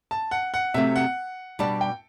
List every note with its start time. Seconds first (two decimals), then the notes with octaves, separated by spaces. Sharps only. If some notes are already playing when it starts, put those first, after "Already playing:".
0.11 A5
0.31 F#5
0.54 F#5
0.74 C3 F#3 A3 C4 E5
0.96 F#5
1.59 B2 G3 D4 G4 D5 A5
1.81 G5